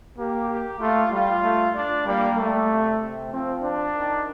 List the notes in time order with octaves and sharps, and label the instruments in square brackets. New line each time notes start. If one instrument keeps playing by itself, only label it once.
[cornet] A#3 [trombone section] G4
[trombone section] G4
[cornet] A3 [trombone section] F4
[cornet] G3 [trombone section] F4
[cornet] A3
[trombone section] D4
[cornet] G3 [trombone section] A#3
[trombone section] G3 [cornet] A3
[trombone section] C3
C3
[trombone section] F3 [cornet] C4
[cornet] D4
[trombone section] D#3